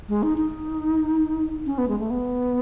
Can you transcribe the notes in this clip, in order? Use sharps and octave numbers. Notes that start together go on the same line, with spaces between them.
G#3
D#4
D#4
C#4
B3
G#3
A3
B3